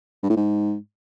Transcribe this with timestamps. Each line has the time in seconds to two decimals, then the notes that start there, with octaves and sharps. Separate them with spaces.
0.23 G2
0.30 A2
0.36 G#2